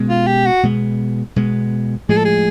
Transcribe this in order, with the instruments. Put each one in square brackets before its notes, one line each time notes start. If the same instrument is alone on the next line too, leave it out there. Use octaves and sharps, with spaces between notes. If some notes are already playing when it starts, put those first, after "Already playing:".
Already playing: [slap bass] B2 G#3 C#4
[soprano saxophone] F4
G4
F#4
[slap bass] B2 G#3 B3
B2 G#3 B3
[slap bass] A2 F3 G#3 [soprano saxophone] G#4
[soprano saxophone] A4
G#4